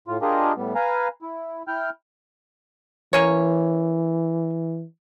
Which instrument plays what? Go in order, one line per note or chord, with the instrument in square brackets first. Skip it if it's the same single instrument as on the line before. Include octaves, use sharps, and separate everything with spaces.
[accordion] A2 F4
D4 F4 G4 G#4 A#4 D#5
A2 G3 B3
B4 F5 G#5 A#5
E4
E4 G5 F6 G6
[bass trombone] E3 [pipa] A#3 C#4 C#5